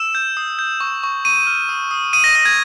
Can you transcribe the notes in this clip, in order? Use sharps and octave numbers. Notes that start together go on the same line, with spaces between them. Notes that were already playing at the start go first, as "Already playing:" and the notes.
Already playing: E6 E7
G6
D#6
G6
C#6
C#6
C#6 D#7
F6
D#6
D#6
D#6 D#7
A#6
D#6 A#6
G#6